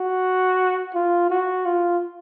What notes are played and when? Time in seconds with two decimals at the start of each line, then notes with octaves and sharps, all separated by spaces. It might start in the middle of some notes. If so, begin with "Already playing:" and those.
Already playing: F#4
0.94 F4
1.30 F#4
1.65 F4